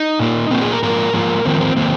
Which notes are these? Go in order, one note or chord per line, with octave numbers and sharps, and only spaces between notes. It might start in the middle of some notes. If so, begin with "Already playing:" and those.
Already playing: D#4
A#2 A#3
A#2 A#3 C4
G#4
A#4
G#2 F3 A#3 A#4
G#2 F3 A#3
F2 D#3 A#3 C4
C4
D#3 A#3 C4